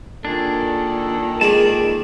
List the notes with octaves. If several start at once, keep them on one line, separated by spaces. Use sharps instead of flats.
A#2 D#3 D4 G#4 A4
G#3 G#4 D5 A5